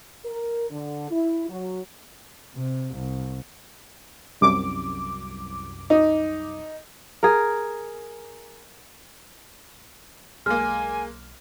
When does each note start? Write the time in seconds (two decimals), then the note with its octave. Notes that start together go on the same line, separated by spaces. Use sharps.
0.25 A#4
0.70 D3
1.11 E4
1.49 F#3
2.56 C3
2.95 C2
4.41 C2 F#2 D6
5.90 D#4
7.23 G#4 A#4
10.46 B1 G#3 A#3 G#5 F6